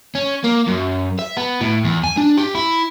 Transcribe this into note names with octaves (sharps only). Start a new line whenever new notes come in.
C#4
A#3
F#2
E5
B3
A2
E2
G#5
D4
G4
E4